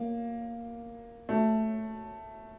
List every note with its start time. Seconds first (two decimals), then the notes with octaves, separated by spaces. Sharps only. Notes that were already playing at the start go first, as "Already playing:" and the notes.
Already playing: A#3
1.29 A3